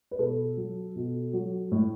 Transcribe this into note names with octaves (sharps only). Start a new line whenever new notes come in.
B4
B2 A4
F#3
B2
F#3
A2